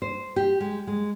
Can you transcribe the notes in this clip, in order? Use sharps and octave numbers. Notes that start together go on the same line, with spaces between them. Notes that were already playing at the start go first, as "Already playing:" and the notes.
C5
G4
G#3
G#3